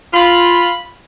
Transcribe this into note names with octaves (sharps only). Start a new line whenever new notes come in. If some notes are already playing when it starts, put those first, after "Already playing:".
F4 B5